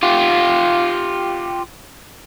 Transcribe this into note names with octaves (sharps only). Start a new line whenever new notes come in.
F4 G4